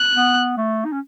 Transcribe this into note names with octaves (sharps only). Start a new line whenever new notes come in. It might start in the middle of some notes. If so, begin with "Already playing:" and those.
Already playing: F#6
B3
A3
D#4
C#4